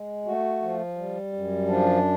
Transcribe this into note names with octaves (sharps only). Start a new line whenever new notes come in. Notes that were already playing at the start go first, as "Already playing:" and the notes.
Already playing: G#3
A3 F#4
F3
G3
F#2
F3 D4